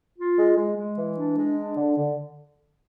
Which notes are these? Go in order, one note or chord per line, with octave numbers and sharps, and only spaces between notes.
F4
G#3
G#3
G#3
E3
D4
G#3
D4
D3
D3